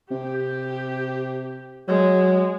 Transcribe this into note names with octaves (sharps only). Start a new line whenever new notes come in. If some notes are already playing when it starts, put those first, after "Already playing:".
C3 G4
F#3 G#3